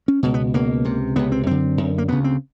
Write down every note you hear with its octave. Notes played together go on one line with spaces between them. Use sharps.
C#4
C#2 B2
B3
C#2 B2 A#3
C#2 C3
C#2 C3 B3
C4
F#2 D3 C4
F#2 D3
A#3
D2 C#3 B3
C4